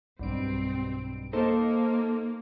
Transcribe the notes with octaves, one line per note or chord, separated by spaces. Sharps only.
B1 G2 C4 D7
A#3 D#4 A4 C5